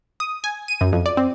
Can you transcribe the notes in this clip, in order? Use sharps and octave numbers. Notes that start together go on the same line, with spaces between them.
D#6
G#5
D#7
F#2
F2
D5
C4